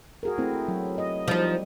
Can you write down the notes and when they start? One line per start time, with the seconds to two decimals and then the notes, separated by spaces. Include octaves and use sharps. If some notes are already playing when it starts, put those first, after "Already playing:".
0.23 F#4 G#4 A#4
0.38 A3 C4 E4
0.68 F#3
0.98 D#5
1.28 F3 G3 D#4